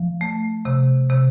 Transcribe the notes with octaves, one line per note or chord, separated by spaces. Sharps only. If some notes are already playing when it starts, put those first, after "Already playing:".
Already playing: F3
A3
C3
C3